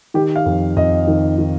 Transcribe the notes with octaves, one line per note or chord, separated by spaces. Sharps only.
D#3 G4
F5
F2
F2 D#5
D#3
D#3